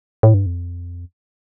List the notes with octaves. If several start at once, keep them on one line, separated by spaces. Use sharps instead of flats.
A2
G2
F2